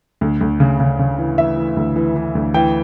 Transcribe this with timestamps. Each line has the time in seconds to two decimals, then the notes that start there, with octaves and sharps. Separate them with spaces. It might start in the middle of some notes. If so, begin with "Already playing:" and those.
0.21 D2
0.41 D2
0.60 C#3
0.80 C#3
0.99 C#3
1.18 E3
1.38 E3 E5
1.57 E3
1.77 D2
1.96 E3
2.16 E3
2.35 D2
2.54 E3 G5